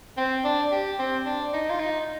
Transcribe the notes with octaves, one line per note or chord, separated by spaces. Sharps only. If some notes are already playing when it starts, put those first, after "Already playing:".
C4
D4
G4
C4
D4
D#4
F4
D#4